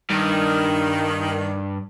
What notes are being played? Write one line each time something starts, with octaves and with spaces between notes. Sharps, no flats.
G2 D#3